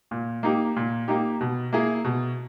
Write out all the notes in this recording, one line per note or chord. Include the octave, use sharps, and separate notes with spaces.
A#2
A#3 D#4 G4
A#2
A#3 D#4 G4
B2
A#3 E4 G#4
B2